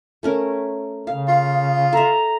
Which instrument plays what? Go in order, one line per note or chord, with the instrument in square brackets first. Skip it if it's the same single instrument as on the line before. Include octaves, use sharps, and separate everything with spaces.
[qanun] A3 C#4 A#4
[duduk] C#3 [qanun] F5
[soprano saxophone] F4
[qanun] A4 E5 [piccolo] A#5